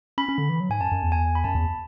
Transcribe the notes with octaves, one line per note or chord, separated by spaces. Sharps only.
C#4 B5
C#4
D3
E3
F#3
G#2 G#5
F#2 A5
F#2
E2
G#5
B5
F#2 A5
E2